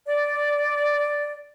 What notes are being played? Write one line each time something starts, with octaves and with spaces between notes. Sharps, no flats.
D5